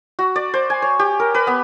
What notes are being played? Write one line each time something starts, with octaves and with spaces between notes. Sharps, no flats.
F#4
D5
C5
G#5
C#5
G4
A#4
B4
B3